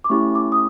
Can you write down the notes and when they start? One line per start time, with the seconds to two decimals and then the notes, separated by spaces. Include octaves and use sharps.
0.04 D6
0.09 A3 C#4 E4 G4 C#6
0.35 D6
0.52 D#6